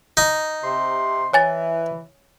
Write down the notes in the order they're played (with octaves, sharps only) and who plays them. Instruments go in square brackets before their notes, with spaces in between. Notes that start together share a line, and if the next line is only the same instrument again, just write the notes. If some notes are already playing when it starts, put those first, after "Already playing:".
[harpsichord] D#4
[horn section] C3 C6
[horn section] E3 [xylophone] C#5 G#5 A6